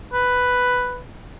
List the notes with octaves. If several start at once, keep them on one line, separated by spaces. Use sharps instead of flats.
B4